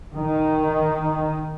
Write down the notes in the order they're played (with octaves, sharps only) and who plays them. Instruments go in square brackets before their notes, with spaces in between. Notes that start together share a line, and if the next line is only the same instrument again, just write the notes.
[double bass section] D#3